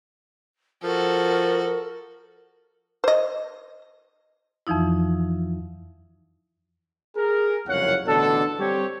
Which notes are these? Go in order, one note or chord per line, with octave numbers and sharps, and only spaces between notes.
F3 F#4 A4 A#4
C5 D#5
F2 E3 F3 D#4 E4
G#4 A#4
F#1 C2 F2 C#5 F5 F#5
A1 B2 D3 D4 A4
G3 C4 G4 C#5